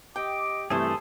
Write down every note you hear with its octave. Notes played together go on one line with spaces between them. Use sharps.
G4 D#5 G5 D6
G2 C3 E3 A3 G#4 A4 C5